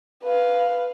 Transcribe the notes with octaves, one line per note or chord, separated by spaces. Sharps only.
B4 F5